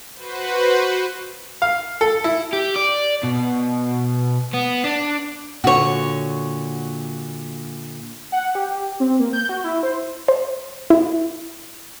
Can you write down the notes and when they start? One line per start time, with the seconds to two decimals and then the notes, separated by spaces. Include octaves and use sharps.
0.14 F#4 B4 C5
1.62 F5
2.01 A4
2.24 E4
2.53 G4
2.76 D5
3.23 B2
4.53 B3
4.84 D4
5.64 A#2 D3 F#4 C#5
8.32 F#5
8.55 G4
9.00 C4
9.19 A#3
9.33 G6
9.49 F#4
9.64 E4
9.83 C5
10.28 C5
10.90 E4